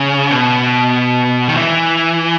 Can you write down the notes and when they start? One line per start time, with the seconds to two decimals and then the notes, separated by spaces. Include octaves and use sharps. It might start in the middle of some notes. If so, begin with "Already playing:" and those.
Already playing: C#3
0.31 B2
1.48 D#3
1.57 E3